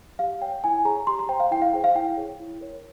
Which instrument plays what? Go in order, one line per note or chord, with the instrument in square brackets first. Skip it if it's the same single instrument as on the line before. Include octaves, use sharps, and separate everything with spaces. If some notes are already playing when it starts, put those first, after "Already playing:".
[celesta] G4 F5
C#5 G5
E4 G#5
G#4 C#5 A#5
G4 C6
A#5
C5 G5
F5
E4 G5
F5
G#4 C5 G5
F5
E4 G5
G#4 C#5
E4
A#4 C#5